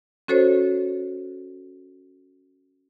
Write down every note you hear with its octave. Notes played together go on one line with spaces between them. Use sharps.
C#4 F#4 A4 C5 C#5